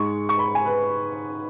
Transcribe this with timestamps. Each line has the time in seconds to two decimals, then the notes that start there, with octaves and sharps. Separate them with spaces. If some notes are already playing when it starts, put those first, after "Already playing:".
Already playing: G#2 G#3 C#6
0.29 C#6
0.39 B5
0.55 G#5
0.66 B4